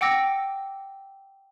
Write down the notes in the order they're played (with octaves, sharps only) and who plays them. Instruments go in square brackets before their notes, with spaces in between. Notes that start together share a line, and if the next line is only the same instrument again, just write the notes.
[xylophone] F#5 G5 D6 E6 A#6